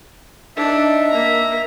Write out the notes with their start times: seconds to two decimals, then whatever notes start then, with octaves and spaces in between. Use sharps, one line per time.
0.56 D4 D#4 E5
1.10 A#3 A#5